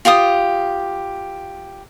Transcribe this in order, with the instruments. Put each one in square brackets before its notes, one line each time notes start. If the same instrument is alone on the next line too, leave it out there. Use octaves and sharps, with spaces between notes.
[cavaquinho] F4 G4 F5 D#6